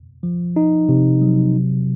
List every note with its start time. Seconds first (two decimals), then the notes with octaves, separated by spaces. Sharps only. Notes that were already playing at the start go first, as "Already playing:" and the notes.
0.23 F3
0.56 D#4
0.89 C3
1.22 F#3
1.55 C3